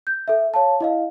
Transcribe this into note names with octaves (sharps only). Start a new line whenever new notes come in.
G6
A4 E5
C#5 F5 A5
E4 D#5 F5